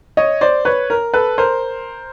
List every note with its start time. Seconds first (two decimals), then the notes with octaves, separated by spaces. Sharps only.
0.17 C#5 D#5
0.41 C5 D5
0.65 B4 C#5
0.90 A#4
1.14 A4 B4
1.38 A#4 C5